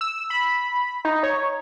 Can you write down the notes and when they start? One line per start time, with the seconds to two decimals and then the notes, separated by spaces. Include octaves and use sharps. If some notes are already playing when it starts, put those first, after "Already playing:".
0.01 E6
0.30 B5
1.05 D#4
1.23 C#5